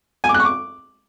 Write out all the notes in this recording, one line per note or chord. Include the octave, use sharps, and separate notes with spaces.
G#5
D6
F#6
C#6
D6